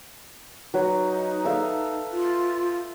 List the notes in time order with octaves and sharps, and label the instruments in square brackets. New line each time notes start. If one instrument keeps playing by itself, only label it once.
[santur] F#3 B4 [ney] D#4
[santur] A4 E5 F5
[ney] F4